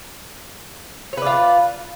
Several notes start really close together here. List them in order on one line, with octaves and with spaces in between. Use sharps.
C#5 B4 D5 F4